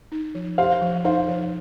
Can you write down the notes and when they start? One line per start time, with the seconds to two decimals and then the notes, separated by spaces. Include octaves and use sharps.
0.12 D#4
0.35 F3
0.58 G4 C5 F5
0.82 F3
1.04 D#4 C5 F5
1.28 F3